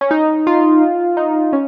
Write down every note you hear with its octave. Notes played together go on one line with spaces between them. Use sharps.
C#4
D#4
F4
D#4
C#4